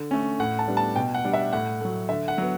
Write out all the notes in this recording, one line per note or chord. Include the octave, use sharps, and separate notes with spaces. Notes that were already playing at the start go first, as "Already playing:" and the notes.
Already playing: D3
A3 C#4
A2 F#5
A5
G3 B3 D4
A5
B2 G5
F#5
G3 D4
E5
A2 F#5
F#3 A3
D3 E5
F#5
F#3 B3